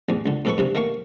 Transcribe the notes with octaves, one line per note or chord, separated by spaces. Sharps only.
A1 E2
C#2 D3
F2 G#2 A4 B4 B5 C#6
G2 C3 E3
D#3 A3 A#3 F5 C#6